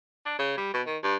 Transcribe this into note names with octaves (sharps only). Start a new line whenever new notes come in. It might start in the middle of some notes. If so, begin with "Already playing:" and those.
D4
C#3
G3
B2
D#3
G2